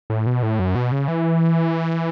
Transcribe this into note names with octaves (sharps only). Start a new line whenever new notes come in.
A2
B2
A2
F#2
B2
C#3
E3